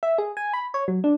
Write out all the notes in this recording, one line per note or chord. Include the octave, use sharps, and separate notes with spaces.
E5
G#4
G#5
B5
C#5
F#3
D4